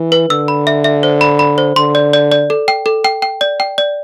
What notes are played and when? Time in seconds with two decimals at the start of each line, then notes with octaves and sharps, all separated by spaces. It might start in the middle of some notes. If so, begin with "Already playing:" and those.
Already playing: E3
0.12 B4
0.30 D3 E6
0.48 B5
0.67 E5
0.84 E5
1.03 C5
1.21 B5
1.39 B5
1.58 C5
1.76 D3 C6
1.95 D5
2.13 D5
2.32 D5
2.50 A4
2.68 G5
2.86 A4
3.04 G5
3.22 G5
3.41 D5
3.60 G5
3.78 D5